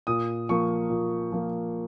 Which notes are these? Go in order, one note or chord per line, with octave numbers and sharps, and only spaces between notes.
A#2 D#6
F3 A#3 C#6
A#2
F3 A#3